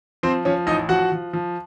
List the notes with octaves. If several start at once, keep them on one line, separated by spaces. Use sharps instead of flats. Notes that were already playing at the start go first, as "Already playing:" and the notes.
F3 C4 C5
F3 C#4 C#5
A1 D#4 D#5
F3 F#4 F#5
F3
F3